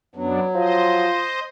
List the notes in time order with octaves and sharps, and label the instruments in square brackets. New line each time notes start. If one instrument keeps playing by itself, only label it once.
[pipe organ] F#2 B3 D4 [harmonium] F#3
[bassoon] F3 [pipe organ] C5 D#5